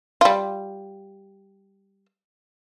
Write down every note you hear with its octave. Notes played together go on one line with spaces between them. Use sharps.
G3 F4